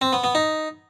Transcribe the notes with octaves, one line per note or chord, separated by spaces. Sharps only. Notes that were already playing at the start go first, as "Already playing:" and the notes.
C4
B3
B3
D#4